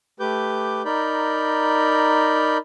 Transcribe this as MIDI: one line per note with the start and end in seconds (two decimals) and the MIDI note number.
0.20 0.82 57
0.20 0.82 67
0.20 0.82 71
0.20 0.82 86
0.20 0.82 91
0.85 2.57 63
0.85 2.57 70
0.85 2.57 74
0.85 2.57 83
0.85 2.57 91